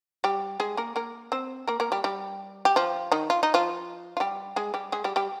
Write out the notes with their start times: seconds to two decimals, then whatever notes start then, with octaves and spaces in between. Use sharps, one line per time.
0.24 G3 G4
0.60 G#3 G#4
0.77 A#3 A#4
0.96 A#3 A#4
1.32 C4 C5
1.68 A#3 A#4
1.80 A#3 A#4
1.92 G3 G4
2.04 G3 G4
2.65 G4
2.76 F3 F4
3.12 D#3 D#4
3.30 F4
3.43 D#4
3.54 F3 F4
4.17 F4
4.20 G3 G4
4.56 G#3 G#4
4.74 G3 G4
4.92 G#3 G#4
5.04 G3 G4
5.16 G3 G4